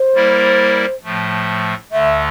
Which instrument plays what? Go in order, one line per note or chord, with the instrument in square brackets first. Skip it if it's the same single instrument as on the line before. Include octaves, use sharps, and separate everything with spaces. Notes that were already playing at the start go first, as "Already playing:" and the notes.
Already playing: [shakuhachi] C5
[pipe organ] G3 A#3 E4 A#4 D5
A2 F3 A3
[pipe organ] D2 D3 A3 [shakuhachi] E5